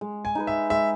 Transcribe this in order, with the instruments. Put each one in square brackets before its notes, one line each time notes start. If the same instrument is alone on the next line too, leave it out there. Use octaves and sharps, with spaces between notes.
[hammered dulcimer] G#3
[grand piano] G#5
[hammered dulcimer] D#4 G#4 B4
[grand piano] E5
[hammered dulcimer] G#3 [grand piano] E5